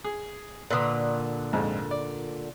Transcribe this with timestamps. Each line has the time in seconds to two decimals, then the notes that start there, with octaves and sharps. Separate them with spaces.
0.04 G#4
0.70 A#2 D3 B4 D#6
1.53 F2 G#2
1.91 D5